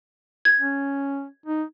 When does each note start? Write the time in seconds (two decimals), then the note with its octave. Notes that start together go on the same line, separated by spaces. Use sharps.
0.45 G#6
0.60 C#4
1.46 D#4